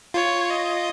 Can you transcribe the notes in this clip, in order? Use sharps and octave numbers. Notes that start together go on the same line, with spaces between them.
F4 C#5
D#5